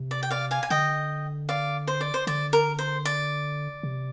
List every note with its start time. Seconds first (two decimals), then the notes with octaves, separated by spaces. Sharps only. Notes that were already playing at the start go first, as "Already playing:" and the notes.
Already playing: C3
0.11 D5
0.23 G5
0.30 D5 F5
0.51 F5 G#5
0.63 G#5
0.70 D3 D#5 G5
1.49 D5 F5
1.87 C5
2.01 D5
2.14 C5
2.27 D3 D5
2.53 A#4
2.79 C5
3.05 D5
3.83 C3